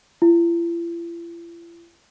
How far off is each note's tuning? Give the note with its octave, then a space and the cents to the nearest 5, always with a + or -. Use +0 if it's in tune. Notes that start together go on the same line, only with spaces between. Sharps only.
E4 +45